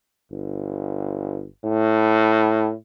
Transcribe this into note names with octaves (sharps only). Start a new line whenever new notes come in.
G1
A2